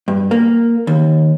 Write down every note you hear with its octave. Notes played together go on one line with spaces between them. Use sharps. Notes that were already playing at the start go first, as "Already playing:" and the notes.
G2
A#3
D#2